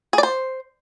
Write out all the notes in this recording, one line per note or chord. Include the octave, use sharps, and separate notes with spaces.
G#4
D5
C5